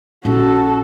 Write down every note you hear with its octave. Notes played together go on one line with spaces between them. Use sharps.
A#1 C#4 E4 F#4 A4